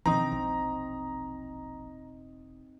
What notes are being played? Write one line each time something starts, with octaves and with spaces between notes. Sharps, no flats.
B2 D#3 F3 C4 D#4 A#5
E1 A#1